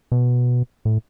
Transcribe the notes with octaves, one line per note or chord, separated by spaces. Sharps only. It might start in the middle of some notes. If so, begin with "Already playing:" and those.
B2
A2